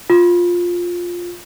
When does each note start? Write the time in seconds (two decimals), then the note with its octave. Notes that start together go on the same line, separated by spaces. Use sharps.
0.10 F4